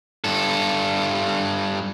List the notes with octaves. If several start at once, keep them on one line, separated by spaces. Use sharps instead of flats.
G2 A4